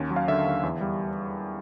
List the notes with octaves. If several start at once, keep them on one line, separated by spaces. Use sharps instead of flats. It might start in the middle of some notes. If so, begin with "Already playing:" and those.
Already playing: D#2 C#4
F#3
F5
D3 E5
D#2
E2
G3